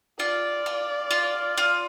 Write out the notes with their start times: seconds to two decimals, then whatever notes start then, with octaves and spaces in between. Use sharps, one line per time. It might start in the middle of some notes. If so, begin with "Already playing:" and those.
0.20 F4 D5
0.66 F4
1.11 F4
1.58 F4